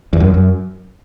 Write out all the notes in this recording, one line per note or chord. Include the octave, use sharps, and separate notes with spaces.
E2
F#2
F#2